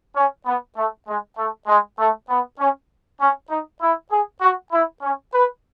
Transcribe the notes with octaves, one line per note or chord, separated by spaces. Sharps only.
C#4
B3
A3
G#3
A3
G#3
A3
B3
C#4
C#4
D#4
E4
G#4
F#4
E4
C#4
B4